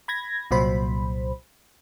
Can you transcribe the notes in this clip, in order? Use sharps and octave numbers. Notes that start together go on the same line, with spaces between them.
B5 G#6 A#6
C2 A#2 F#3 C5 B5